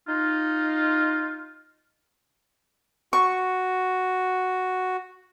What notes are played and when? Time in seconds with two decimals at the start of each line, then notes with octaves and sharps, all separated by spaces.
0.06 D#4 F4
3.13 F#4 C#6